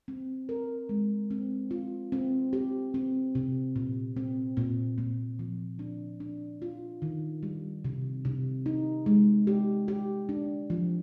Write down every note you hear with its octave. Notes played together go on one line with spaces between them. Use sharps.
C4
A#4
G#3
C4
F4
C4
G4
C4
C3
A#2
C4
A#2
A#2
F3
D4
D4
F4
D#3
G3
C3
C3
D#4
G#3
G4
G4
D4
F3